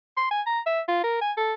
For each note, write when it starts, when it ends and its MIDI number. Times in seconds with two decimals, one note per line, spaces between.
0.17 0.29 84
0.31 0.42 80
0.46 0.60 82
0.66 0.81 76
0.88 1.01 65
1.04 1.21 70
1.21 1.32 80
1.37 1.53 69